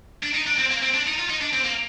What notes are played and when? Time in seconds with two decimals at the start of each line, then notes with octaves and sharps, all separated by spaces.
0.23 D4
0.34 D#4
0.46 D4
0.58 C4
0.70 A#3
0.82 C4
0.94 D4
1.06 D#4
1.18 F4
1.30 D#4
1.41 D4
1.53 C4
1.65 A#3